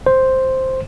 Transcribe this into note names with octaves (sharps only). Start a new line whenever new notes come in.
C5